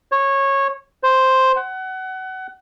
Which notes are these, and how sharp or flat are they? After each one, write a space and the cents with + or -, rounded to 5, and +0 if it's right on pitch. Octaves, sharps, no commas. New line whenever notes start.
C#5 -15
C5 +0
F#5 +25